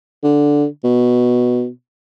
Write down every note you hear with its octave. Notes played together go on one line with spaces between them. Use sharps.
D3
B2